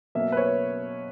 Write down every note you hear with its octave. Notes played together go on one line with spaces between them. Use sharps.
B2 F#3 A#3 E5
B4
C#5